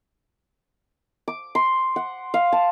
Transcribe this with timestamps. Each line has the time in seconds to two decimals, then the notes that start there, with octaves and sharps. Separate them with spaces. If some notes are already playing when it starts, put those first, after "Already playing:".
1.28 D6
1.55 C6
1.96 F#5
2.34 F5
2.52 A5